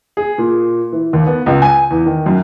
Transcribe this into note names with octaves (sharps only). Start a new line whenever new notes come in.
G#4
A#2
E3
D#2
B3
C#2
G#5
E2
D#3
F#2